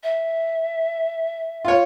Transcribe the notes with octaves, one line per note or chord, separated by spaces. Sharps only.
E5
F4 C#5